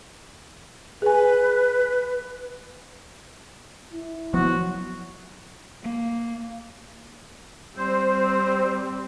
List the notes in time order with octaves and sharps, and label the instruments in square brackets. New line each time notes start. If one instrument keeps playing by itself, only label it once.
[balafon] G#4 G#5 [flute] B4
[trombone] E4
[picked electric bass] F3 B3 [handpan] F#3 [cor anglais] F#4
[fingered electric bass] A#3
[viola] G3 C4 [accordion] C5